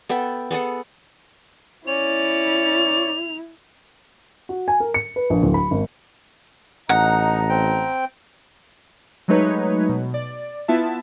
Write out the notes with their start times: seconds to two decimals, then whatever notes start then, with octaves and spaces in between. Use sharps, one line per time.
0.09 B3 A4 E5 G5
0.51 B3 G#4 A4 F#5
1.87 C#4 E4 C#5 D5 F7
4.49 F#4
4.68 G#5
4.80 A#4
4.94 C#7
5.16 B4
5.30 A#1
5.43 D1
5.54 B5
5.71 G#1
6.89 A1 D#4 D#5 F#5 A5 A#5
7.49 C4 G5
9.28 F#3 G#3 A3 D#4 B4 C#5
9.89 B2
10.14 D5
10.68 B3 E4 F4 E5 A5